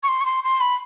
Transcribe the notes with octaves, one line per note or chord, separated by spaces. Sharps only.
C#6
C6
C#6
C6
C6
B5